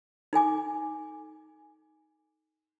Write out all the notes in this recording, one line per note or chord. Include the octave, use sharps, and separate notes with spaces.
D#4 A4 G#5 D6